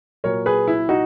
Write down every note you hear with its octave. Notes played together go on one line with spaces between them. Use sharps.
A#2 F#3 A#4 C#5
G#4 B4
E4
D#4 F#4